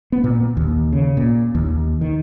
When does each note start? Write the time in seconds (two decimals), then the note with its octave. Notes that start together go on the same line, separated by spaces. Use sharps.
0.12 B3
0.24 A#2
0.57 D#2
0.92 C#3
1.17 A#2
1.55 D#2
2.01 D#3